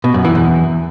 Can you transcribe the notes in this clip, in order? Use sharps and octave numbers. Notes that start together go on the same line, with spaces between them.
B2
F#2
E3
E2